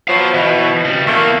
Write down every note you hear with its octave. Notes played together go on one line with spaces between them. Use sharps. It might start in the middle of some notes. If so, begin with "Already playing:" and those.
B2 F3 F#3 F5 A5
B2 E3
C#3 G3
E2 A3 A#3